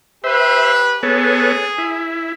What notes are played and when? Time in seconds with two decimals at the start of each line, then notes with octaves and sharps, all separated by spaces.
0.24 G4 B4 C5 E5
1.03 B3 G#4 A4 C#5
1.78 E4